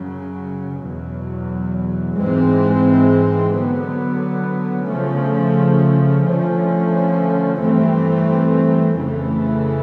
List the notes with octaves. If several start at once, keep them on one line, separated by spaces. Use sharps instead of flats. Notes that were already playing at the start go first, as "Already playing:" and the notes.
Already playing: F#2 C#3 F#3
E2 B2 F#3
G#2 E3 G#3 C4
D3 F#3 B3
C#3 F3 A3 C#4
D3 F3 A3 C#4
G2 E3 A3 C4
F2 C#3 E3 A3